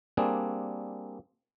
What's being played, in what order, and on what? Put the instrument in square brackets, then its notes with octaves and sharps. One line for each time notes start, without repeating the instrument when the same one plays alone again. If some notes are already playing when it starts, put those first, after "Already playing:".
[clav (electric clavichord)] G3 A#3 C4 D4 G#4